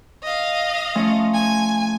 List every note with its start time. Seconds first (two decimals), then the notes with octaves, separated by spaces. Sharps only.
0.24 D#5 F5
0.95 F3 A3 C#4
1.34 G#5